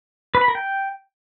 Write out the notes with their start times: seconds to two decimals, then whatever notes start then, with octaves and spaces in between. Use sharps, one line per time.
0.35 B4
0.41 B5
0.48 A#4
0.55 G5